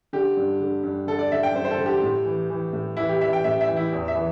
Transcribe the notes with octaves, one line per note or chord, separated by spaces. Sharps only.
D3 G4
G2
D3
G2
D3 A4
D5
D3 E5
G5
G2 C5
C5
A4
D3
G4
A2
E3
E3
A2
E3 E4
G4
E3 E5
G5
A2 E5
E5
E3
E4
E2
E5
E3